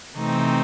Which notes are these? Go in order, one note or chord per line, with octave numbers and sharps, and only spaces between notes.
C3 E3 A3 C4 D#4